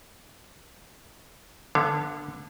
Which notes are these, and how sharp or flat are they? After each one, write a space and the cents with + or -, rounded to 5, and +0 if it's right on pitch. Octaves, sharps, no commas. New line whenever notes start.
D3 +5 B3 -30 F5 -40